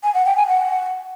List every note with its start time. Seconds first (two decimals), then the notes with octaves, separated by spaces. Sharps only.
0.03 G#5
0.14 F#5
0.25 G5
0.36 G#5
0.48 F#5